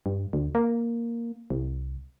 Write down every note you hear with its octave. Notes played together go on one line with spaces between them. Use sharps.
G2
D2
A#3
C2